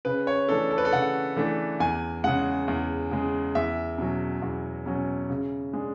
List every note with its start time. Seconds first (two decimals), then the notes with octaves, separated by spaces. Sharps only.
0.05 C#3 B4
0.27 C#5
0.49 E3 A3 D4 A4
0.71 A4
0.78 B4
0.85 A4
0.93 C#3 F#5
1.36 E3 A3 D4
1.80 E2 G#5
2.24 C#3 G#3 F#5
2.68 E2
3.11 C#3 G#3
3.55 E2 E5
3.98 B2 F#3 C#4
4.42 E2
4.86 B2 F#3 C#4
5.30 C#3
5.73 G#3 D4